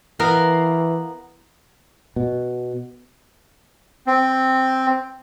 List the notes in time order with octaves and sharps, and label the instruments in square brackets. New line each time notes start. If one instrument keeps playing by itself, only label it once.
[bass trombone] E3 [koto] B3 A#4 F5
[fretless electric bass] B2
[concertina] C4